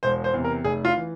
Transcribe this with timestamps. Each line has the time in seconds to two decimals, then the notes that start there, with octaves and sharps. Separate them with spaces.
0.03 E1 C5
0.24 C5
0.34 E2 C3
0.44 A#4
0.64 F1 G#4
0.85 F4
0.97 E3